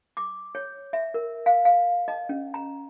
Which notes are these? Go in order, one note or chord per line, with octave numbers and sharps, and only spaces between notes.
D6
C#5
E5
A#4
F5
F5
D#5
C#4
A#5